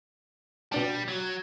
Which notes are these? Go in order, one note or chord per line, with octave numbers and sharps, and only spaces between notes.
B2 G3 D4 A5
F#3